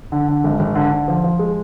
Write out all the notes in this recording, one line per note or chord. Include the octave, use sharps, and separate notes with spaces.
D3
D3
G#1
G#1
D3
D3
F3
F3
G#3